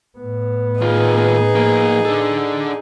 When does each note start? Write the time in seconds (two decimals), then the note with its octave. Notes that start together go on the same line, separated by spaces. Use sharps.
0.18 A2 B3
0.81 D#2 D#4 F4 G#4
1.55 F3 A#3
2.05 D4 A4